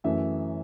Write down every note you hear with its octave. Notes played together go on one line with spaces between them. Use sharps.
F#2 E3 A3 E5